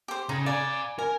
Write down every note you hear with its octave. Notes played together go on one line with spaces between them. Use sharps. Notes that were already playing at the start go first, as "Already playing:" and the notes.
G4 C5
C#3 D#4
D5 F5 G#5
A#4 G#5